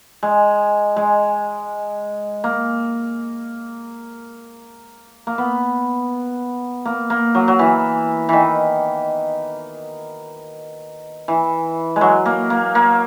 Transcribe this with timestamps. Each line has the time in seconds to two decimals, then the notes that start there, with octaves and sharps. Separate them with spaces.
0.23 G#3
0.96 G#3
2.44 A#3
5.27 A#3
5.38 B3
6.86 A#3
7.10 A#3
7.35 F#3
7.48 F#3
7.59 E3
8.29 D#3 E3
11.28 E3
11.96 G#3
12.01 F#3
12.26 A#3
12.50 A#3
12.75 A#3